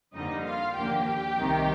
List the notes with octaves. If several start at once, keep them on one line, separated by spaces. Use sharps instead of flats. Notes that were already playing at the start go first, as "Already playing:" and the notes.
F2 D3 G3 A#3 D#4 D#5
F4 F5
D#2 D3 F3 A#3 G4 G5
C2 C3 D#3